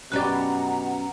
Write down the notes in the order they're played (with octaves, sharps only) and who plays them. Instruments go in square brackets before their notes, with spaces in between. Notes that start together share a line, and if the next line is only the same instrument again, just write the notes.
[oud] F#2 C#4 G4 [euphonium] B2 [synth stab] B4 D5 [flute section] F#5 A#5